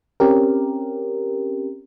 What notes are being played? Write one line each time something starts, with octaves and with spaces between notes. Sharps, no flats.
C4 C#4 G4 A#4